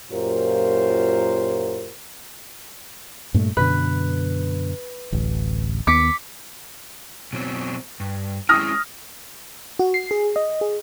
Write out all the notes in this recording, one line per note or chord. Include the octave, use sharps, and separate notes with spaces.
F#2 A#2 F4 G4 A#4 C5
G2 A#2 A3
F#2 B2 D3 B4
D1 A1
D#2 B3 D6 B6 C#7
B2 F#3 C4
G2
G#3 C#4 E4 D#6 F6 A#6
F#4
C7
G#4
D#5
G#4